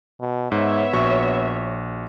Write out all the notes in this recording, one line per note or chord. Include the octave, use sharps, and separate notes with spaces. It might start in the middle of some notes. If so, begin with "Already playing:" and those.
B2
G#2 B3 C#5 E5
A#1 F#4 C#6